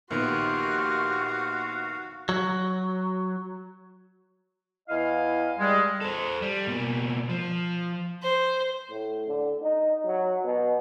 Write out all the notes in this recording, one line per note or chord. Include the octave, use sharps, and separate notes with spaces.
A#1 D#3 B3 F#4 G4 F5 C6
F#3
E2 E4 D#5 F5
G3 G#3
A4 C5
G3
B2 A#3
F3
C5
A2
D3
D#4
F#3
B2